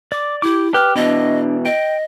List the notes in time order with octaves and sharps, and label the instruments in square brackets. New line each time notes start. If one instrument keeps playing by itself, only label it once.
[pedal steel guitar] D5 [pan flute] D6
[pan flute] E4 [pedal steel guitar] G4 D6
[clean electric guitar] G4 [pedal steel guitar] B4 [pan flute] F6
[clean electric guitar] B2 E3 [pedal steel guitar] D4 [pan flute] D#5
[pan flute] D#5 [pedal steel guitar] G5